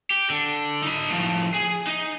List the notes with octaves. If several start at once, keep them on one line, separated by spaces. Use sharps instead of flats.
G4
D3
D#4 B5
A2 F3
G#4
D#4